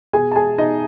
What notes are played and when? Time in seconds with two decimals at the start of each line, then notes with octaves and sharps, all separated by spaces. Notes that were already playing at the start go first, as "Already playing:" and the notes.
0.13 B2 G#4 G#5
0.32 A5
0.36 G#4 G#5
0.58 B2 D#4 D#5